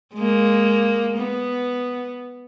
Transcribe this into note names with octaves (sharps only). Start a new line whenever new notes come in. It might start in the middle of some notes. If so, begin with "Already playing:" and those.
G#3 A#3
B3